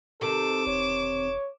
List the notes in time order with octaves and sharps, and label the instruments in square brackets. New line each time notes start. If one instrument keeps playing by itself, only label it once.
[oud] C3 D#3 [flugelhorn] A4 [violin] D6 E7
[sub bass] E1 [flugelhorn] C#5